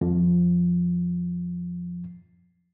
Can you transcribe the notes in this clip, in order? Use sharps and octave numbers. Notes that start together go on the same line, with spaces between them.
F2 F3